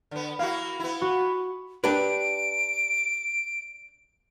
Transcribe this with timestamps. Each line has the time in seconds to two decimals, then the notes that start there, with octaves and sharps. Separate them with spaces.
0.11 D3 B3
0.39 A#3 E4 F#4 F5
0.80 B3 E4
1.02 F#4
1.84 D4 G4 B4 D7